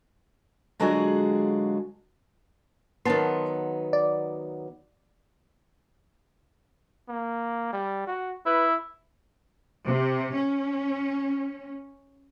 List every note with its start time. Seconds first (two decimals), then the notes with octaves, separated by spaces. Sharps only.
0.80 D3 F#3 G#3 F4 F#4 G#4
3.05 D#3 F#3 B3 A5 C6
3.93 D5
7.09 A#3
7.73 G3
8.07 F#4
8.46 E4 B4
9.85 C3
10.35 C#4